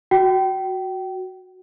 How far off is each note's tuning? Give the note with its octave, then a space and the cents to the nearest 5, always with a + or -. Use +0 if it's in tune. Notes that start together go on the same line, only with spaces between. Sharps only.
F#4 +0 G5 -30